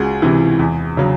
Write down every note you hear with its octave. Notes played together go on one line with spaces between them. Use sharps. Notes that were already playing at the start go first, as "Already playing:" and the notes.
Already playing: C#2 F#4 G#4
C3 E3
E2
C#3 F#3